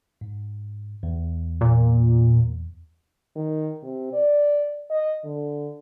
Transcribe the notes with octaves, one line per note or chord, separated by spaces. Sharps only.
G#2
E2
A#2
D#3
C3
D5
D#5
D3